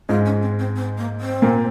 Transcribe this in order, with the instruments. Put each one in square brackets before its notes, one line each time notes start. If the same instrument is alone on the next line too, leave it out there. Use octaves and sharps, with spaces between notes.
[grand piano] G#2 G#3 [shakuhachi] F4
[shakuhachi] C#4
C4
C4
C4
A#3
C4
[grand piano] A#2 A#3